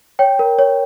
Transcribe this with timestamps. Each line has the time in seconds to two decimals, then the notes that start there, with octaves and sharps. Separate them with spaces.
0.19 C#5 G5
0.39 A#4
0.59 C#5